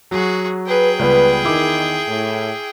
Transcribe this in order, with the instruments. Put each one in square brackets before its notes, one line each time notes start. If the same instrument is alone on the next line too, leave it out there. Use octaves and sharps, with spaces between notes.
[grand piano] F#3 [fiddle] F#4 G#4
[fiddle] G#4 G5 [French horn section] B4
[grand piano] C#2 G3 B3 [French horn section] B4
[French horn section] E2 D#3 [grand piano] E4 D6
[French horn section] A2